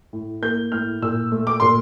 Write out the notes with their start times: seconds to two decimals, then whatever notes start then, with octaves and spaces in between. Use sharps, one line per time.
0.13 A2
0.42 A#3 G6
0.72 A2 F6
1.02 A#2 E6
1.32 A3
1.47 D6
1.60 A#2 C6